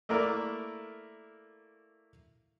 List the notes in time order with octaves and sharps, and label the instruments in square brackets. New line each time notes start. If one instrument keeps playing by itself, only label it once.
[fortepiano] A3 A#3 E4 A#4 D5